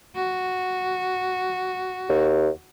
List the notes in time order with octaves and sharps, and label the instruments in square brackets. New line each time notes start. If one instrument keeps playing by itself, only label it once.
[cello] F#4
[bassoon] D#2